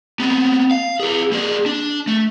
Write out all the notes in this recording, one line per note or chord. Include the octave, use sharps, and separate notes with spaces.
B3 C4
F5
G#4 B4
A#3 G#4
D4
A3